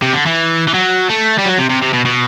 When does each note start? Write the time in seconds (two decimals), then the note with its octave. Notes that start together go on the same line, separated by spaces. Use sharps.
0.02 C3
0.13 D3
0.26 E3
0.68 E3
0.74 F#3
1.09 A3
1.38 G3
1.46 F#3
1.58 C3
1.70 C3
1.82 C3
1.93 B2
2.05 B2